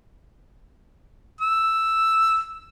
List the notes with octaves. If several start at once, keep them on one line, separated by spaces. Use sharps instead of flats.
E6